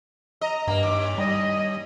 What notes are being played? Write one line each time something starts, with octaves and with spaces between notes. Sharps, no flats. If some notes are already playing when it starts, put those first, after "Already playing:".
D#5 A#5
G2 A#3
D#2 D6
G3 D#5